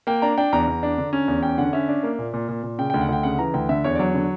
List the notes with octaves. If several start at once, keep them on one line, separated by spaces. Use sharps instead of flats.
A#3 G5
D4 A#5
D4 G5
E2 A#5
E2
D4
D3
C#4
E2
C#4 G5
D3 F#5
C#4 E5
D4
A#3
A#2
A#2
A#2
A#2
C#3 G5
D2 G5
F#5
D2 G5
C#3 F#5
E3 A#5
D2 G5
D3 E5
E2 C#5
D5
F#3 C#5
D3